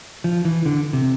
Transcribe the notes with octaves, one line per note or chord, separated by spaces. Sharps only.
F3
E3
D3
C3